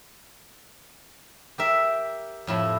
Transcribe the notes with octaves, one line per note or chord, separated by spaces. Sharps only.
G4 A#4 E5
F2 A2 E4